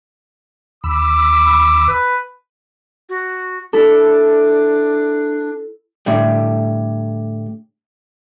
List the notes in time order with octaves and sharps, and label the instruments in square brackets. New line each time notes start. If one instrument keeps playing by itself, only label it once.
[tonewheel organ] D#2 B5 E6 [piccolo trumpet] D6
[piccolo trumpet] B4
[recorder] F#4
[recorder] D4 [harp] E4 A4
[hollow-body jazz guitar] A2 D3 G3